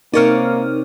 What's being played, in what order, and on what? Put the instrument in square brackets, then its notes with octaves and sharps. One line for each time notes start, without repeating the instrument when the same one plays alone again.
[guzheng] C3 C#5 D5 [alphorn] A#3 [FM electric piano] D#4 A#4 F6